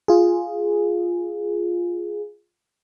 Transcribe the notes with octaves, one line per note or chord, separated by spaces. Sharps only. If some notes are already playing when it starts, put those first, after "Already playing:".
F4 G#4